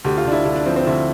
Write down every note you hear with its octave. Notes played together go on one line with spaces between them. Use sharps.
D2 G4
F4
D2 D4
E4
D2 E4
D4
F3 C4
C4
D2 E4